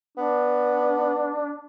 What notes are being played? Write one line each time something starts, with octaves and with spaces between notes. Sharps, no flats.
B3 D4